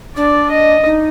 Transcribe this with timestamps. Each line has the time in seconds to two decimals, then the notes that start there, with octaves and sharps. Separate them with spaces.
0.17 D4 D5
0.50 D#5
0.85 D#4